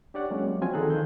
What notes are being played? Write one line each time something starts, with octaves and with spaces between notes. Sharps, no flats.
D4 G4 C#5 D5 F#5
F#3 G#3 A#3 C#4
F3 C4 F4 F#4 G#5
D#3 G#4 A4 A#5 F#6
D#3 C5 F5 G6